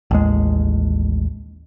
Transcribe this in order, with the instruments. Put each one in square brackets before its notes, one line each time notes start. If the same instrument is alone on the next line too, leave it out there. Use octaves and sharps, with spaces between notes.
[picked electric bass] A1 D#2 G#3